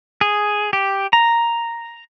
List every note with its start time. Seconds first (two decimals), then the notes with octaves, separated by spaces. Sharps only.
0.21 G#4
0.73 G4
1.13 A#5